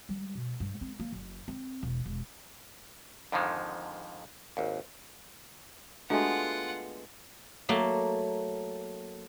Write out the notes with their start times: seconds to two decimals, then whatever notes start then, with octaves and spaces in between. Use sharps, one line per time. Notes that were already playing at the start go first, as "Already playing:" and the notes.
0.09 G3
0.35 B2
0.60 G2
0.81 C4
1.00 A#3
1.12 F#1
1.48 C4
1.83 E1
2.06 E1
3.32 F2 G#2 D3 D#3 F3 G#3
4.57 G#1 D#2
6.10 G#3 A3 B3 D4 F4 F#4 F#5
7.69 F#3 A3 A#3